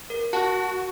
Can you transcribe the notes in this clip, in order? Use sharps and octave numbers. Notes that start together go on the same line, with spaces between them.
A#4
F#4 A5 F#6